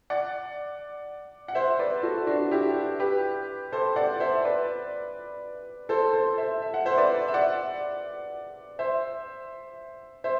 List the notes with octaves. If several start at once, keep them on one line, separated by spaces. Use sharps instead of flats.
D5 F#5
F#5
C5 E5
B4 D5
F#4 A4
D4 F#4
E4 G4
G4 B4
A4 C5
D5 F#5
C5 E5
B4 D5
A4 C5
A4 C5
C5 E5
E5
F#5
C5 E5
B4 D5
E5
D5 F#5
C5 E5
C5 E5